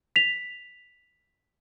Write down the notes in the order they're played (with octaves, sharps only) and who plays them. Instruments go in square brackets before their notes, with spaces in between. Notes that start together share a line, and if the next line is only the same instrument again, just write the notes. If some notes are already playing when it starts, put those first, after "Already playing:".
[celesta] B6 F7